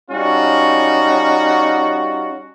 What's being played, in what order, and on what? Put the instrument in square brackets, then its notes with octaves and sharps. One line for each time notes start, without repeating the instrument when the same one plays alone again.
[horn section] G3 C#4 D#4 F4 F#4